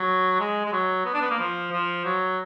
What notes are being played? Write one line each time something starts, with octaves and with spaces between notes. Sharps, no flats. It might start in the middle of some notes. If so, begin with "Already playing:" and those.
Already playing: F#3
G#3
G#3
F#3
B3
D4
B3
A#3
F3
F3
F#3